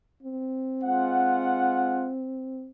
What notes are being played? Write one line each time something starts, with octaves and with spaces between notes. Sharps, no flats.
C4
G#3 F4 F#5